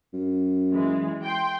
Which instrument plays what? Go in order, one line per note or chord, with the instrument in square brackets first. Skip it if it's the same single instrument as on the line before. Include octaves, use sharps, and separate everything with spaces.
[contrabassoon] F#2
[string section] E3 G#3
G5 C6